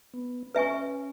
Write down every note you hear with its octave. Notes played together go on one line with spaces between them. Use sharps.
B3
C#4 B4 E5 G#5 C#6